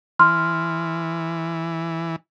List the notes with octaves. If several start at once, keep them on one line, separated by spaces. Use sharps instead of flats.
E3 C6 F6